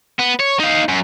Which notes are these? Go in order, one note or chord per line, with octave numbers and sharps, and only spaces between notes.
B3
C#5
D#4 F5
F#2